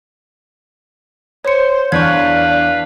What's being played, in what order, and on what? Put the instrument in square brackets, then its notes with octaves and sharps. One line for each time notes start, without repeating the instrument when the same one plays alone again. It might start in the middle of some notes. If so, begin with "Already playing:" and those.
[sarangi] C5 [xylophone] C#5 C#7
[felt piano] E2 [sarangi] D4 [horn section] B4 F5 [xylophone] C#6 G6 G#6